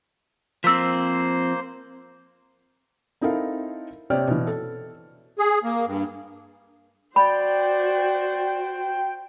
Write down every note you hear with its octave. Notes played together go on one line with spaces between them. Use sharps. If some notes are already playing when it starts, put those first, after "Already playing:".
F3 A#3 C4 C5 C6 E6 B6
C4 D#4 E4 A4 A#4 F5
C3 C#5 D5 G5 F6
B2 E3
A4
G#4
A#3
G2
F#4 C5 D5 G5 B5